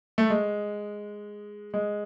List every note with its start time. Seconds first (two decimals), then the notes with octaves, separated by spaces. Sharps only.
0.18 A3
0.30 G#3
1.74 G#3